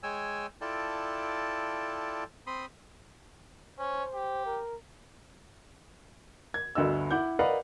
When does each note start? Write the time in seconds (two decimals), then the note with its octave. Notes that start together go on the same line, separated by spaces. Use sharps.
0.03 G#3 C#5 G5 G#5 E6
0.61 E4 F4 A4 D5 G5 A5
2.47 C4 B5 C6 D#6
3.79 C#4 C5
4.14 G4
4.46 A#4
6.54 G#6
6.75 G1 D2 F#4 D#5 E6
7.11 E4 F#5 D6 G6
7.39 A#4 B4 D5 D#5 F5 F#5